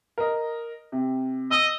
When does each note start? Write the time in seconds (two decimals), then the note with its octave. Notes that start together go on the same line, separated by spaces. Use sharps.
0.18 A#4 D#5
0.92 C3
1.51 D#5 D#6 E6